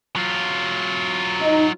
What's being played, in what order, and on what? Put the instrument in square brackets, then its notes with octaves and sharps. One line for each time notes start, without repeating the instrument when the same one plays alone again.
[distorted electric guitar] F#3 F4
[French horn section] D#4